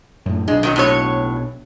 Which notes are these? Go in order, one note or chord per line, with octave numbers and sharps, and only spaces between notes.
F#2 A2
B1 G#3 D4
D#3 F3 F#3
A2 F#3 C#5